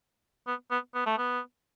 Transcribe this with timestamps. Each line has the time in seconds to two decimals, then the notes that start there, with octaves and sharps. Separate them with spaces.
0.47 B3
0.71 B3
0.94 B3
1.06 A3
1.18 B3